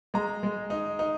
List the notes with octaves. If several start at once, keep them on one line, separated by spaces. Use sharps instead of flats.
G#3 A#5
G#3
D#4
D#4